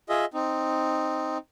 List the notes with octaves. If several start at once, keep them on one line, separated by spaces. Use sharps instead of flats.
F4 G#4 D#5 E5
C4 D#4